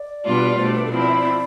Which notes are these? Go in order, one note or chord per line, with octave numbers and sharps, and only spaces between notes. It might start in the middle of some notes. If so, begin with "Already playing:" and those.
Already playing: D5
B2 G3 B3 D4 F4
D5
B2 A3 D4 C5
B4
A4
F3 C4 E4 B4
D5
E5
D5